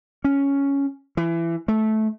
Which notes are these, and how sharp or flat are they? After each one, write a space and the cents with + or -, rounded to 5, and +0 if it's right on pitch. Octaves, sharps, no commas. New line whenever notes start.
C#4 +5
E3 +25
A3 -15